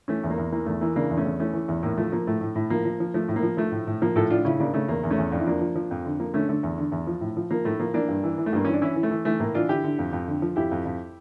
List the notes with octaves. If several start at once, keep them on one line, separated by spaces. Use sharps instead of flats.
E3 A3 C#4
E2
A#3
E2
E3 A#3
E2 A3
E3 A#3
C#3 A#3 D4
E2
A3 C#4
E2
E3 A3 C#4
E3
E2
A2 A#3
F3 A3
F3 A#3
A2 A3
A2
A2
F3 A#3
F3
F3
F3 A3
A2
A#3
F3
F3 A3
A2
A2
F3 A#3
A2 F4 A4
A2 D4 F4
C#3 C#4 E4
C#3 A#3 D4
C#3 A3 C#4
E2 A#3
E2
A3 C#4
E2
F2 D4
E4
F3 A#3 D4
F3
F3
F2
D3
F3 A#3
D3 A3 C#4
D3 A3
E2
D3
E2
F3
A2
F3
F3 A#3
A2 A3
F3 A#3
E3 A#3 D4
G2
E3
E3
A3
G2 A#3
E3 C#4
D4
E3 C#4 E4
E3
A3
E3
E3 A3
A2 A#3
E3 D4 F4
D3 E4 G4
D3
F2
F2
D3
F3
F2 E4 G4
F2
F2